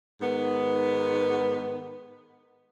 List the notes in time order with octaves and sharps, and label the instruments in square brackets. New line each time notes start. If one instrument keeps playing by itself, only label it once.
[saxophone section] G#2 D#3 B3